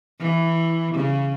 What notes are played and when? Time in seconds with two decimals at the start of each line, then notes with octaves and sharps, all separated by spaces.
0.20 E3
0.94 C#3